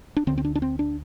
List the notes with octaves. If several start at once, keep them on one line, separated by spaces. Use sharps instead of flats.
D4
D2 D3 C4
C4
D4
D4
C4
D4